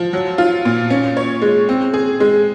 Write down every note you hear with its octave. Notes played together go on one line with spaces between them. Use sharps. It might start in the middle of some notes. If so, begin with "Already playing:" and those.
Already playing: F3
F#3
F4
A#2
C#4
C#5
G#3
C4
G#4
G#3